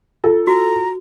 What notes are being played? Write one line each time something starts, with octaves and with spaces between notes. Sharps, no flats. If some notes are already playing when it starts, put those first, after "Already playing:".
F4 A4
F#4 A#5